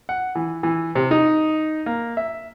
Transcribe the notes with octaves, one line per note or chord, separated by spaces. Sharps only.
F#5
E3
E3
C3
D#4
A#3
E5